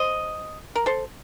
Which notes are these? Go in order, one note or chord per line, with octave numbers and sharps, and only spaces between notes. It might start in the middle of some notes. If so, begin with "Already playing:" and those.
Already playing: C5 D#5
A#4
A4 C5